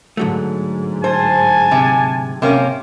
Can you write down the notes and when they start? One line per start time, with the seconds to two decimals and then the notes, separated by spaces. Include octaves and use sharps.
0.17 G#2 D3 F#3 A3
1.04 C5 G#5 A5
1.71 C3
2.42 C3 A#3 C#4